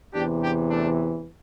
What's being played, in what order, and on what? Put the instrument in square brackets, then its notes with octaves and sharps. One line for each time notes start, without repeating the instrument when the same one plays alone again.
[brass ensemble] E2 C3 E3 D4 G4
D4 G4
A3 D4